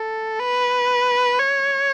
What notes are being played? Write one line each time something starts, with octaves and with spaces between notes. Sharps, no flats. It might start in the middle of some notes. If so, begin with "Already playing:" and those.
Already playing: A4
B4
C#5